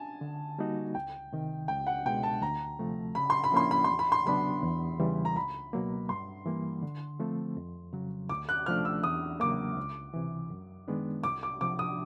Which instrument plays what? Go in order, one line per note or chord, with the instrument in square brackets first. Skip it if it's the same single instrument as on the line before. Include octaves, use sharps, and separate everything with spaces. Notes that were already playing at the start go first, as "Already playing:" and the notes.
Already playing: [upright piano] G#5 A5
[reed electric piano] D3
G3 A#3 D#4 F#4
[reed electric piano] C#2 [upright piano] G5
[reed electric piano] C3 D#3
[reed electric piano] C#2 [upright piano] G5
[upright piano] F#5
[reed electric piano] B2 G#3 [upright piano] G5
[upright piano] A5
[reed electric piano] D2 [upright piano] A#5
[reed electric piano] C3 F3 A3
[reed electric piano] C#3 [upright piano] B5
[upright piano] C6
B5
[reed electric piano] F3 A#3 C#4 E4 [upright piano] C6
[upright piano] B5
[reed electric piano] E2 [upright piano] C6
[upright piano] B5
C6
[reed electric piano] C#3 F#3 B3 D4 [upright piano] B5
[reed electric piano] E2
C#3 E3 G3
[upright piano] A#5
[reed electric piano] C#2 [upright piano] B5
[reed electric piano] B2 F#3 A#3
[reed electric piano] G2 [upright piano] C6
[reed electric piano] E3 G3 A#3
D3
F3 A3 C4
F2
C#3 F#3
[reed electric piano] D2 [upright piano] D6
[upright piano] F#6
[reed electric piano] C3 F3 A3 D4 [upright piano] F6
[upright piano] E6
[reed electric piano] E2 [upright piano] D#6
[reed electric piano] C#3 F#3 A#3 [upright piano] D6
[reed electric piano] C#2
C3 E3
F#2
D#3 G#3 B3 D4
[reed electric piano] C2 [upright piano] D6
[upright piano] D6
[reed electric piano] C3 F3 [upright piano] D6
[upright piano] D#6